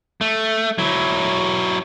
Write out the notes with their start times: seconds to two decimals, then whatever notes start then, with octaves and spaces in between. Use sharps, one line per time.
0.21 A3
0.78 F#3 E4